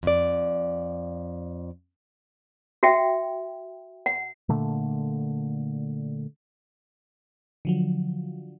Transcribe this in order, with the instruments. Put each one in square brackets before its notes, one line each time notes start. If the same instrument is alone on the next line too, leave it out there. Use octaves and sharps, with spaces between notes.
[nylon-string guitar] F2 D5
[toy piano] F#4 E5 G5
F#5
[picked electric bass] A#2 D3 A3
[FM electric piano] D3 F3 F#3